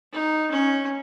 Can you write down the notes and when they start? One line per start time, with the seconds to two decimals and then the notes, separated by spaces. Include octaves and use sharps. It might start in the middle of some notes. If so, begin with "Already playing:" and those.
0.13 D#4
0.51 C#4